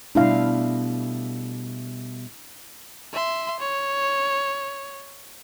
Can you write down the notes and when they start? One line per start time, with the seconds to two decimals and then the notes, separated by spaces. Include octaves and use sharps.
0.15 B2 G3 A3 D4 E4 F5
3.13 E5 C6
3.60 C#5